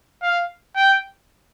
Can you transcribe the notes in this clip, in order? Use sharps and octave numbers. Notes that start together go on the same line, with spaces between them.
F5
G5